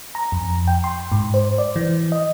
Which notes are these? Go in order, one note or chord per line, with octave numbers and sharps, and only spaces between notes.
A#5
F2
G5
C6
G#2
C5
D5
E3
D#5